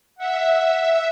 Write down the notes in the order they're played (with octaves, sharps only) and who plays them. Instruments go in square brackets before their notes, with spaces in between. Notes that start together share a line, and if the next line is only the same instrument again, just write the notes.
[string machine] E5 [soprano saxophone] F#5